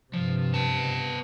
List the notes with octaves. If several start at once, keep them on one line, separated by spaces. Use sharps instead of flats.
G2 C3 F3
B3 A5